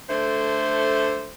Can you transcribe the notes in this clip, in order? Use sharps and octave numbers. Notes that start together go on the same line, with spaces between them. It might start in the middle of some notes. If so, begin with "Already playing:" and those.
D3 A3 C5